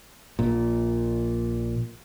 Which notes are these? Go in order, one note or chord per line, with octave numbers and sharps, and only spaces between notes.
A#1 A#2